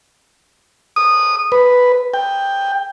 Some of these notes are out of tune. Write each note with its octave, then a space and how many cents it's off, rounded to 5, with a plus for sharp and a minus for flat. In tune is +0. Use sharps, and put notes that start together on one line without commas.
D#6 -15
B4 +0
G5 +10